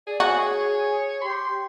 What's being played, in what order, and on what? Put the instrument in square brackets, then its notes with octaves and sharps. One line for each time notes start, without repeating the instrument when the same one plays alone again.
[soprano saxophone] G#4 [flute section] D5
[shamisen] F#4 [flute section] G#4 G#5 [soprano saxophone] C#5
[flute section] G4 [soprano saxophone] C6